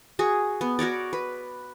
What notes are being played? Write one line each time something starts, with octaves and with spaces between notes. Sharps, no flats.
F#4 G#4
B3
F#4 A#4 C#5 D5
B4